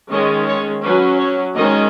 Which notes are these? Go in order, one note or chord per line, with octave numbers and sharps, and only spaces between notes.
D#3 G#3 C#4 D#5
C#5
F#3 C#4 B4
C#5
D#3 G#3 C#4 D#5